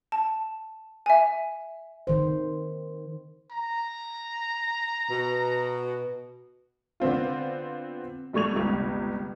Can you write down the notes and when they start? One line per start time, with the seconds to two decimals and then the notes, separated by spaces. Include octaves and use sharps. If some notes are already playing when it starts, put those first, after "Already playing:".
0.12 A5
1.06 E5 G#5
2.07 D#3 C5
3.51 A#5
5.10 B2
7.00 D3 B3 C4 F4
8.33 B1 G3 A3 C#6 G#6 F7
8.53 G1 C#2 C3